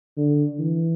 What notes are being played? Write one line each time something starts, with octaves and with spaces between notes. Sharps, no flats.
D3
E3